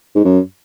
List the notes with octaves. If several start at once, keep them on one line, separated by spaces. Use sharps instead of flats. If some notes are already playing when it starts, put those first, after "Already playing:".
G#2
F#2